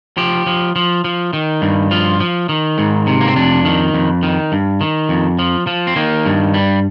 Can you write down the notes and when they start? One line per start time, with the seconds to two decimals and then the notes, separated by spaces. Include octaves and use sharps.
0.17 F3 G4
0.46 F3
0.76 F3
1.04 F3
1.33 D#3
1.62 G2
1.91 F3 F4
2.20 F3
2.49 D#3
2.78 G#2
3.07 C3
3.21 A#3
3.28 C4
3.36 F2 D4
3.65 D#3
3.94 F2
4.23 D#3
4.52 G2
4.81 D#3
5.09 F2
5.39 F3
5.67 F3
5.87 C4
5.96 D#3 A#3
6.25 G2
6.54 G3